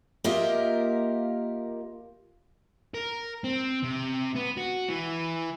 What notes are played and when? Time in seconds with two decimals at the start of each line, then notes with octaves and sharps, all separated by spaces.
0.24 A#3 F4 G4 A#4 D#5 E5
2.94 A#4
3.44 C4
3.83 C3
4.35 B3
4.57 F#4
4.89 E3